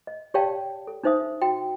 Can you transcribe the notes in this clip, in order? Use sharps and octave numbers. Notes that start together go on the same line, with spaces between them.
D#5
G4 C#5 D5 F5 G5 A5
A4
D4 D#4 C5 E5 D#6
F#4 G5